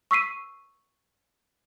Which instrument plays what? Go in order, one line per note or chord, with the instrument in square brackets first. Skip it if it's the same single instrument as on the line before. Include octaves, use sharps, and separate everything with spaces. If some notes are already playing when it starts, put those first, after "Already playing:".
[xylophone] C#6 E6 B6 C7 D#7